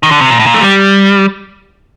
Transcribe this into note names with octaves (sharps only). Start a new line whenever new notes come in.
D#3
D3
C3
A#2
A2
A#2
A3
G3